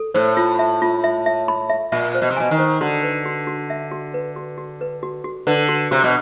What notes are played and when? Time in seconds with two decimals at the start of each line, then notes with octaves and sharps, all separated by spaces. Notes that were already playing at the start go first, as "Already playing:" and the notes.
Already playing: A4
0.14 A2 C5
0.37 F4
0.59 E5
0.82 F4
1.04 E5
1.26 E5
1.48 B5
1.70 E5
1.92 A#2 E5
2.14 C5
2.22 B2
2.31 C3
2.37 B2 G#5
2.51 D#3
2.59 C5
2.81 D3 F#4
3.03 B4
3.26 F#4
3.47 F#4
3.70 E5
3.91 F#4
4.14 B4
4.36 F#4
4.58 F#4
4.81 B4
5.03 F#4
5.24 F#4
5.47 D3 B4
5.69 F#4
5.91 C3 F#4
6.04 B2